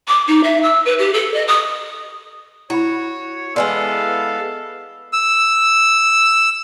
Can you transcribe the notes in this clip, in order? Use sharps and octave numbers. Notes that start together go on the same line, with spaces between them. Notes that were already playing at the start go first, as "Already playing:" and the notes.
D6
D#4
E5
E6
B4
G4
A4
D#5
D#6
E4 F#4 C#5 B5
D3 E3 G#3 B3 A4 F5 G#5 C6
E6